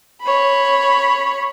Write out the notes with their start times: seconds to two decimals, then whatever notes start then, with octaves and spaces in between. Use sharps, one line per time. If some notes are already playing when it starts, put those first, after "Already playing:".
0.23 C#5 B5